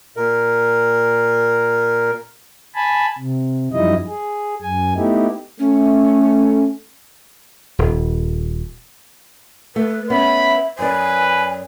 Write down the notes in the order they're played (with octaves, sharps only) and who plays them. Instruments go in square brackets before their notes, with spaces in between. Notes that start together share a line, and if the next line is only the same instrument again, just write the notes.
[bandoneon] A#2 A#4
[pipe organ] G#5 A5 B5
C3
F#2 F3 G3 D#4 E4 D#5
G#4
F#2 G#5
A3 B3 D#4 E4 G4
[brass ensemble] A3 [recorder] C#4
[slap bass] D#1
[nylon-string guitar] A3 [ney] B4
[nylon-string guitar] B3 C#4 [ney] E5 [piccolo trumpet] B5
[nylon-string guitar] F#2 D5 [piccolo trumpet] B4 [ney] G#5